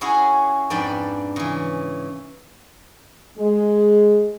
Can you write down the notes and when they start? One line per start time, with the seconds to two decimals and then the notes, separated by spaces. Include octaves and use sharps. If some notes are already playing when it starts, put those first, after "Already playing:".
0.01 C#4 E4 F#4 G#4 F#5
0.70 F2 G#2 D4 B4 D5 G5
1.36 C#3 E3
3.38 G#3